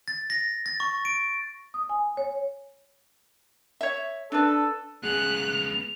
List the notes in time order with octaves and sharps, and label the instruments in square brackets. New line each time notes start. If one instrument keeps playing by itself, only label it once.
[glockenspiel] A6
A#6
A6
C#6
D7
[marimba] D#6
G#5
C#5
[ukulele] C#5 E5
[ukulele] D4 B4 [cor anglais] A4
[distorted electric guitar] C#2 B3 [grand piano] G#4 [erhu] F#6 [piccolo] F7